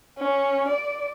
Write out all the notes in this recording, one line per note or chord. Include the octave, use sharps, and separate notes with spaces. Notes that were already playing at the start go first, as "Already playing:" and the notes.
C#4
D5